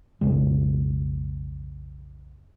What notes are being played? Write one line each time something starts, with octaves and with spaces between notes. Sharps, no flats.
B1 F2 C#3 G#3